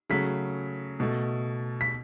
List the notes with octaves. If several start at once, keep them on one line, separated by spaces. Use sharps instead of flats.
C#3 F#3 A3 B6
B2 A3
B6